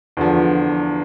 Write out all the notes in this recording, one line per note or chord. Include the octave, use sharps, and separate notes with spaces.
E2 D3 F3